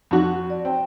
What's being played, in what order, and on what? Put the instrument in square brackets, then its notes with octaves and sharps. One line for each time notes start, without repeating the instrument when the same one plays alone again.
[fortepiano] F2 F#4 [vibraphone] A5
[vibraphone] D5 A5
[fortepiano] C4 [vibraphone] G5